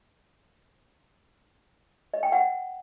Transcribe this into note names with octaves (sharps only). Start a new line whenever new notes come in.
D#5
G5
F#5